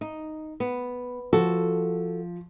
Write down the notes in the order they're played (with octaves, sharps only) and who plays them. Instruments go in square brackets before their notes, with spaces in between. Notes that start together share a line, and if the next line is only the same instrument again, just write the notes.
[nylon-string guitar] D#4
B3
[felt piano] F3 [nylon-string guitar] F#4 A4